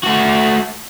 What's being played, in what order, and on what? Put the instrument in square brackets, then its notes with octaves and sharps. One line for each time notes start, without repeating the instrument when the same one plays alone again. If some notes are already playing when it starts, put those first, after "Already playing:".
[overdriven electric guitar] A3 F#4